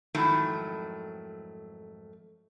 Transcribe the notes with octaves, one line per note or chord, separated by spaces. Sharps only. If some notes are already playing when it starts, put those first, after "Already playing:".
F2 G#2 D#3 F#3 A3 E4